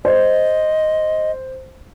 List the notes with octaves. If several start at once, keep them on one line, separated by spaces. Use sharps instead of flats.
C5 D#5